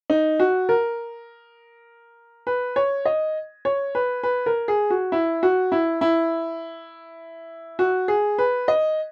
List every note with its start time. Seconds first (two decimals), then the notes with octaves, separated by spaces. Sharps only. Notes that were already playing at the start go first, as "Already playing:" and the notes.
0.10 D#4
0.40 F#4
0.69 A#4
2.47 B4
2.76 C#5
3.05 D#5
3.65 C#5
3.95 B4
4.23 B4
4.46 A#4
4.68 G#4
4.90 F#4
5.12 E4
5.43 F#4
5.72 E4
6.01 E4
7.79 F#4
8.08 G#4
8.38 B4
8.68 D#5